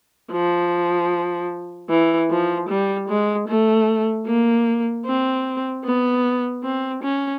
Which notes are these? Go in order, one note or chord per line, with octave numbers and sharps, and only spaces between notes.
F3
E3
F3
G3
G#3
A3
A#3
C4
B3
C4
C#4